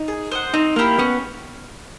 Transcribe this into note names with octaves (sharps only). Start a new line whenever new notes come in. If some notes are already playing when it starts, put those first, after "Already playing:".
Already playing: D#4
G#4
C5 D#5 F#5
C4 D#4
A#3 E4 G4 A#4
B3 C#4